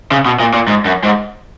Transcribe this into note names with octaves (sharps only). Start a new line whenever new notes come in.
C#3
B2
A#2
A#2
G#2
F#2
G#2